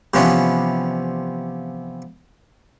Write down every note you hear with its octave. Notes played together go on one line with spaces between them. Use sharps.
C3 E3 F3 B3 C#4 D4